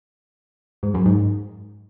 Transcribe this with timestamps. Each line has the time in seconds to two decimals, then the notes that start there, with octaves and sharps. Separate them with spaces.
0.83 G#2
0.94 F#2
1.05 G#2